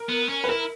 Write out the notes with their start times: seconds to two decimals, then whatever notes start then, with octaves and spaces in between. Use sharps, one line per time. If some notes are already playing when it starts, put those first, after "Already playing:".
Already playing: A#4
0.09 B3
0.29 C#4
0.44 B4
0.49 E4 A#4